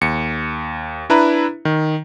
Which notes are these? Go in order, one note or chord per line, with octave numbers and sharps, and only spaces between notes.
D#2 C#7
D4 E4 B4 A#5
D#3